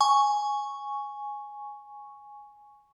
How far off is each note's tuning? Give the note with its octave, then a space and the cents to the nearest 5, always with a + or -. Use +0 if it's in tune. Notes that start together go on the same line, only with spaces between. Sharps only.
G#5 +0 C#6 +0